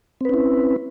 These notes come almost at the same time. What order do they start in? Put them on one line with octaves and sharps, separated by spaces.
C4 B4 C#4 E4